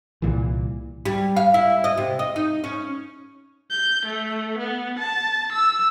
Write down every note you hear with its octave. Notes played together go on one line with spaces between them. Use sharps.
C2 A#2 E3
G3
F5
E4
D#5
C3
D#5
D#4
C#4
G6
A3
B3
A5
E6